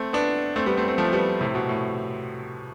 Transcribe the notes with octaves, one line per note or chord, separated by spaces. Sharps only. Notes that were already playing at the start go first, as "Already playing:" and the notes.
Already playing: A3 C4
B3 D4
A3 C4
G3 B3
A3 C4
A3 C4
F3 A3
G3 B3
A2 C3
B2
A2